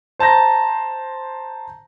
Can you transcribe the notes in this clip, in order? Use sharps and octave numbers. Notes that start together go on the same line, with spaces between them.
C5 A5 A#5 G6 A#6